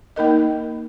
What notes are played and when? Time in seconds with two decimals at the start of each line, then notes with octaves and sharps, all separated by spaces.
0.16 A#3 D#4 A#4 D#5